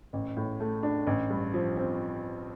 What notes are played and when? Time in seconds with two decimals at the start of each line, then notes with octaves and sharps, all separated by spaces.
0.13 A1
0.36 A2
0.60 A3
0.83 D4
1.07 A1
1.30 G2
1.54 F3
1.76 C4